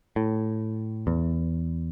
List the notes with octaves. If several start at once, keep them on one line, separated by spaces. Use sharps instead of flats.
A2
E2